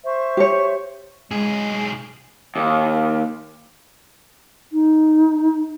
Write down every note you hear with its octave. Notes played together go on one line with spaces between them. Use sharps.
C5 E5 C#6
G4 C#5
B1 G#3 G#4
D#2
D#4